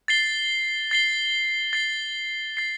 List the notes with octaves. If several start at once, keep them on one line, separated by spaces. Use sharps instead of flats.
A6 C7 G7
A6 C7 G7
A6 C7 G7
A6 C7 G7